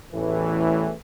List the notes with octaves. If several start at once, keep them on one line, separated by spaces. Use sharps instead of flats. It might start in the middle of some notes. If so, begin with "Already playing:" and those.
A1 E2 A2 E3